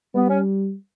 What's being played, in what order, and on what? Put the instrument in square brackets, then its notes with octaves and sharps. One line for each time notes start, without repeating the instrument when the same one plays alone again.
[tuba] G3 [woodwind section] B3
[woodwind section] C#4